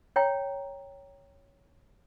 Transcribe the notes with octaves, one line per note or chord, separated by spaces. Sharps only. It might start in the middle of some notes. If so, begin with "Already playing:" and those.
C#5 G5 A#5